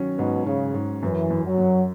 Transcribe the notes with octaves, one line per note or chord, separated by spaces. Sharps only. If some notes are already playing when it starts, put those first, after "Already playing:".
Already playing: D#3 F#3 C#4
G#2 B2
C#3 C#4
G#2
F#2 E3
F#2
F#3
F#2